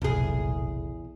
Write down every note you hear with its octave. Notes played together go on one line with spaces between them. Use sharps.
F1 B1 E2 A#2 G#4